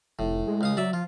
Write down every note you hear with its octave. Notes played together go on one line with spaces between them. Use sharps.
F1 A2
G#3
C#2 F5 D#6
F#3 D5 E5
F3 F4